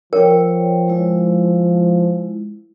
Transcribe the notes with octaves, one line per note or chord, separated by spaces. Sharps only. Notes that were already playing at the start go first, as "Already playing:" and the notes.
F3 A#4 C#5 G5
G#3 E4